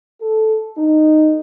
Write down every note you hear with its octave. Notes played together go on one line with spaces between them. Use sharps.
A4
D#4